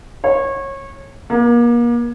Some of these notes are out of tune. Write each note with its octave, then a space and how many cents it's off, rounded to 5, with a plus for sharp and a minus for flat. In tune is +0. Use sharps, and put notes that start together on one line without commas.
C#5 -25
A#3 +35